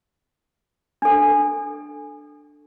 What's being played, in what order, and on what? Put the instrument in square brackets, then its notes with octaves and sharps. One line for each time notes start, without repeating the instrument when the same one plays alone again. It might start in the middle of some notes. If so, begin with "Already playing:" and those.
[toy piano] D4 A4